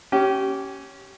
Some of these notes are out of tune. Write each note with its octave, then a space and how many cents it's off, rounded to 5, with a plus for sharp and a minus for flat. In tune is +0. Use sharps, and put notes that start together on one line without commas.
C#4 +0 G4 -25